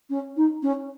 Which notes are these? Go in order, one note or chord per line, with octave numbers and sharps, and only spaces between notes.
C#4
D#4
C#4